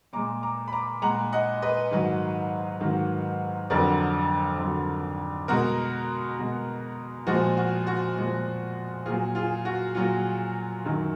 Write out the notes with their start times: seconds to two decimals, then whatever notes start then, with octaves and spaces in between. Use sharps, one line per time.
0.13 A#2 G#3 A#5 D6
0.43 A#5 D6
0.68 B5
0.73 A#5 D6
1.02 A#2 G#3 F#5 A#5
1.32 D#5 F#5
1.62 B4 D#5
1.92 G#2 D#3 F#3
2.80 G#2 D#3 F#3
3.70 F2 D3 F#3 A#4 D5
4.59 F2 D3 F#3
5.48 B2 G#3 F#4 A#4
6.38 B2 G#3
7.27 A#2 F3 G#3 F#4
7.57 F#4
7.87 F#4
8.17 A#2 F3 G#3
9.06 A#2 F#3 F4 G#4
9.35 F4 G#4
9.65 F#4
9.95 A#2 F#3 F4
10.85 F#2 D#3 F#3